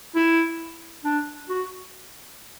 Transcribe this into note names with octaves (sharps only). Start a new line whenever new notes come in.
E4
D4
F#4